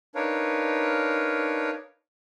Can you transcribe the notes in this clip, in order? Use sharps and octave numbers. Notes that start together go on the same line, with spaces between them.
D4 D#4 A#4 B4 C#5 F5